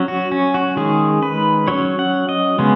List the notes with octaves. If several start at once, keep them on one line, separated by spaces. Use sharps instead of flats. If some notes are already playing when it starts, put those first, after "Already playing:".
Already playing: F#3 C#4
F#4
C#4
F#4
D#3 G#3 C#4 G#4
B4
F#3 C#4 C#5
F#5
D#5
C#3 G#3 B3 C#4